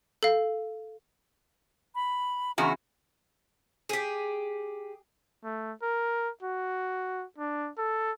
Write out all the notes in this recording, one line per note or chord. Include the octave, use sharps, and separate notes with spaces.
A4 F5
B5
E2 C#3 F#4 E5 A#5
G4 G#4
A3
A#4
F#4
D4
A4